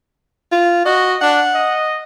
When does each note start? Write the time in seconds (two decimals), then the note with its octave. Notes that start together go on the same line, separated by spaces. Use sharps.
0.52 F4
0.85 F#4 D#5
1.21 D4 F#5
1.54 D#5